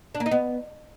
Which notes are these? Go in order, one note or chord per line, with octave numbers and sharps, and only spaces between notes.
D4
A#3
D#4
B3